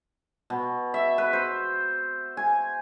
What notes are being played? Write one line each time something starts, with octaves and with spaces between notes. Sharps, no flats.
B2
E5
B4
C5
G#5